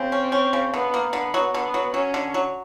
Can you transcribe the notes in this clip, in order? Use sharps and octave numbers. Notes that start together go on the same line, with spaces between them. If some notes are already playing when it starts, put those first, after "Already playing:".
Already playing: C#3 C4
C#4
C#4
C#3
D3 B3
A#3
D3 B3
F#3
D3 B3
F#3
F#3 C#4
D3
F#3